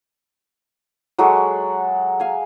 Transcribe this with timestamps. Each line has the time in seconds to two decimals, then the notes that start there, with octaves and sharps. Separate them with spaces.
1.19 F#3 G#3 F#4 A4
2.20 F5 G#5